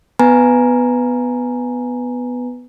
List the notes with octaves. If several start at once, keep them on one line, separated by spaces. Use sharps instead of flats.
B3 B4 G#5 A#5